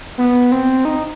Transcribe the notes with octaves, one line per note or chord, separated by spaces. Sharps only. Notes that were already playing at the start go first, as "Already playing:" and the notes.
B3
C4
D#4